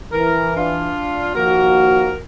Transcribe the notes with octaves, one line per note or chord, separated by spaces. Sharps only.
E3 A#4
D4 F4
D#2 F3 A#3 F#4 A#4